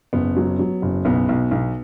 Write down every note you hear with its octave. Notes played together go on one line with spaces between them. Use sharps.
F#1 B3
F#3
F#3
F#1
B1 B3
B1
B1